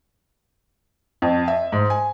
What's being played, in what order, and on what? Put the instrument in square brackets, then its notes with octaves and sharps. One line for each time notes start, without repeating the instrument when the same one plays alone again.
[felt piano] F2
E5
G#2
G#5